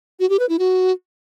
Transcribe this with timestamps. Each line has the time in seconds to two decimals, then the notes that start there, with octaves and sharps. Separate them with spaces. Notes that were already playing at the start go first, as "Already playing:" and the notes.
0.20 F#4
0.30 G4
0.39 B4
0.49 E4
0.59 F#4